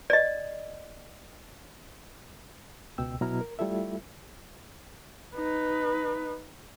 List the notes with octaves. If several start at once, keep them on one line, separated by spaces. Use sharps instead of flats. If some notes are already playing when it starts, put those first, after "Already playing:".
D5 D#5
C#2 B2 G5 E6
B2 F#3 B3 E4 A#5 F6
A#4
G3 A3 E4 F4 A4 E5
D#4 B4